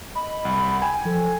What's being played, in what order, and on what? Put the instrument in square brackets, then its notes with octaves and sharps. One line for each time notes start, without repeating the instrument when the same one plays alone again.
[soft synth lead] D#5 [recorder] B5
[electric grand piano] C2 [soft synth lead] F#5
[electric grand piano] G5 G#5
[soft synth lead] F3 [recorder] A4